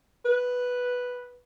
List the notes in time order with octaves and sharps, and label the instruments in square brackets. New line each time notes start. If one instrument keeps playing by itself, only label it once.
[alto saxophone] B4